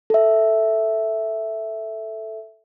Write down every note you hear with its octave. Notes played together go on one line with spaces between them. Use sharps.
A4 E5